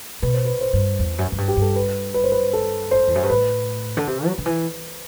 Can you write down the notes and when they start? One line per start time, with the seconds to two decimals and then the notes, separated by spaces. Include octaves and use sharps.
0.22 B2 B4
0.34 C5
0.45 B4
0.61 C5
0.73 G2
0.99 E2
1.19 F#2
1.32 F#2
1.38 G2
1.48 G4
1.57 G2 A4
1.76 B4
2.14 B4
2.24 C5
2.32 B4
2.53 A4
2.91 C5
3.07 E2
3.15 F#2
3.23 G2
3.30 A2 B4
3.97 D3
4.07 C3
4.26 F#3
4.38 D3
4.46 E3